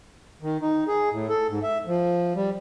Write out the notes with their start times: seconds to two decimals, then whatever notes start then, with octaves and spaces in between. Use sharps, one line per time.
0.42 D#3
0.62 D#4
0.88 G#4
1.12 A2
1.29 A4
1.48 G#2
1.63 E5
1.87 F3
2.35 G3